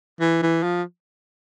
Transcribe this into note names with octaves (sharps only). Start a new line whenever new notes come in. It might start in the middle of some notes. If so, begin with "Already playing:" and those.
E3
E3
F3